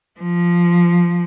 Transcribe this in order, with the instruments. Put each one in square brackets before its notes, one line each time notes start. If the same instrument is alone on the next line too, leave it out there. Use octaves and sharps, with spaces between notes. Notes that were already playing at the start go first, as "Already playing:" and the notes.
[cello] F3